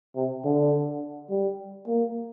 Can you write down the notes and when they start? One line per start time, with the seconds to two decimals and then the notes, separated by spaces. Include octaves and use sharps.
0.16 C3
0.44 D3
1.30 G3
1.87 A#3